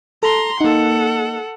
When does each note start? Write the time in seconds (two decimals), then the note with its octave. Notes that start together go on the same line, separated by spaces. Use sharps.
0.23 A4 A#5 C6
0.61 A#3 D#4 A4 F#5